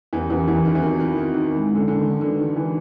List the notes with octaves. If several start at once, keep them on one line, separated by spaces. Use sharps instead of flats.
E2 E3 C#4 E4 G4 A#4
E2 E3
E2 E3
D#3
E3
D#3 C4 D#4 F#4 A#4
D#3
D#3
D#3
G#3 C#4 E4
D3
D3
D#3
D3 D4 F#4 B4
D#3
E3